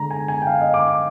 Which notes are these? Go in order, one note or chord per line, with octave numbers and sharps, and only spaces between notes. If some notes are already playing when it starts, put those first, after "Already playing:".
Already playing: D3 G#3 A#5
G#5
G#5
G5
F5
D#5
D6
D6